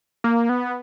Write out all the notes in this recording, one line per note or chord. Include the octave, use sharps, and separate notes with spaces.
A#3
B3